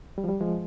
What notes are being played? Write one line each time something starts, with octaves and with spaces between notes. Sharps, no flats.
G3
F3
G3
F3 G#3